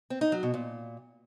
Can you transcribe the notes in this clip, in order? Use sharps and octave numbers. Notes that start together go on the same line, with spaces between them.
C4
D#4
F#3
B2
A#2